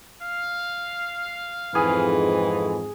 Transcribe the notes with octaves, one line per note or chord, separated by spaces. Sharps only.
F5
F2 G#2 E3 G#4